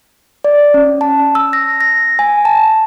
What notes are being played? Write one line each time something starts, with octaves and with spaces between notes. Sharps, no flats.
D5
C#4
A5
E6
A#6
A#6
G#5
A5